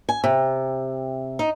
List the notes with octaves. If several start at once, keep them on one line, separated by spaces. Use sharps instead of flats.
G#5
C3
D#4